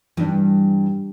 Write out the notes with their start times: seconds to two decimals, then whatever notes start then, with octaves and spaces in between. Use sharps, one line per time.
0.17 G2 E3 D4